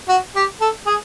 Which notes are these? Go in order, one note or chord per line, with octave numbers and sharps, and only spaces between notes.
F#4
G4
A4
G#4